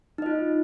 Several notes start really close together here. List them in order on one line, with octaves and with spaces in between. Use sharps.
D#4 D#5 F4